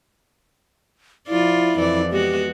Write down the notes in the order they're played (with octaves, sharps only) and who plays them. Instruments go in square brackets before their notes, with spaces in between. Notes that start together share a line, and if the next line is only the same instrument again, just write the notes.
[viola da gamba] F3 F4 D5 [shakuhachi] E4
[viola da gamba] F2 E3 D5
[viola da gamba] G#3 B3 F#4 [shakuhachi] G4